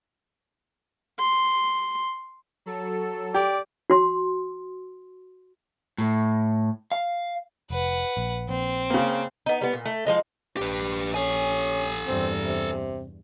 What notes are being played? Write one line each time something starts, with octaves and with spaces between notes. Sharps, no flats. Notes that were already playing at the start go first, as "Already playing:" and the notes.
C6
F#3 A4
G4 D5
F#4 C6
A2
F5
F1 B4 F#5
A#1
A#1 C4
C#3 A#3
B3 D#4
G3 B3
A#2
A3
F3 G#3 D#4
A#1 G4 B4
C#4 A4 G#5
E2 G2 C4
C3